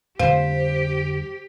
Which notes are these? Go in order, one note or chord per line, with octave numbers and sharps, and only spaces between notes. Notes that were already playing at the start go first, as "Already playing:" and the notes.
F2 D3 G3 G4 C5 F5